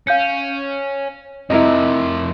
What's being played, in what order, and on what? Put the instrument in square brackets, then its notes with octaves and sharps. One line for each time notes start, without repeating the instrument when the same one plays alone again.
[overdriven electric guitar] C#4 [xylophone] F5 G6 C#7
[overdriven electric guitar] F2 C3 [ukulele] E4 A#4 D#5